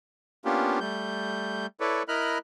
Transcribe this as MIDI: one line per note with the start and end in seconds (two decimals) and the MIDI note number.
0.45 0.79 58
0.45 0.79 59
0.45 0.79 61
0.45 0.79 62
0.45 0.79 65
0.45 0.79 67
0.80 1.66 55
0.80 1.66 57
0.80 1.66 91
1.80 2.03 64
1.80 2.03 69
1.80 2.03 71
1.80 2.03 73
1.80 2.03 74
2.08 2.38 64
2.08 2.38 70
2.08 2.38 75
2.08 2.38 83
2.08 2.38 89
2.08 2.38 90